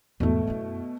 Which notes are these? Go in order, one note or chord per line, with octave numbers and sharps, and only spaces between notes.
E2 G#2 B2 A3
F#2 E4